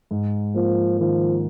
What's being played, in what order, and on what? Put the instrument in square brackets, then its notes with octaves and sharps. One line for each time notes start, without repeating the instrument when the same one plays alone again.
[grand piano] G#2
[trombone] F3 [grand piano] A#3
[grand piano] D#3 [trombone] F3